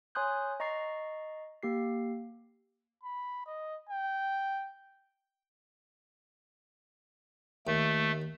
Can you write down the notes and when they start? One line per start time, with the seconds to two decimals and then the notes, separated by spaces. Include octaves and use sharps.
0.15 C#5 G#5 C6 D#6 F#6 G6
0.60 D#5 A#5 C#6 A6 C7
1.63 A#3 G4 C7
3.03 B5
3.46 D#5
3.89 G5
7.67 D#2 A3